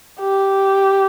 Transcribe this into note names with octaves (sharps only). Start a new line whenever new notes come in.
G4